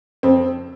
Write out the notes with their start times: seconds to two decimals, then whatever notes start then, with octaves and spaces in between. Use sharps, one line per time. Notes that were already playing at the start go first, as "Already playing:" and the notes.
0.23 F2 C4